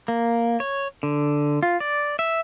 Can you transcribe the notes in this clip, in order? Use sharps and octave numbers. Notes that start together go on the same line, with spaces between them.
A#3
C#5
D3
F4
D5
E5